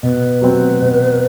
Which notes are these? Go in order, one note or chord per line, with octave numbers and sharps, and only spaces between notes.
B2 B4
F#3 C4
B2